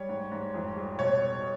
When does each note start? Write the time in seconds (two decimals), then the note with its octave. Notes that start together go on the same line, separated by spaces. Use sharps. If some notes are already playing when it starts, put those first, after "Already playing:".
Already playing: G3 C#5
0.09 G#2
0.32 G#2
0.54 F2
0.76 G3
0.99 B2 C#5